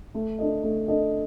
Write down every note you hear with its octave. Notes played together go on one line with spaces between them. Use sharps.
A3
D4 A4 D#5
A3
D4 A4 D#5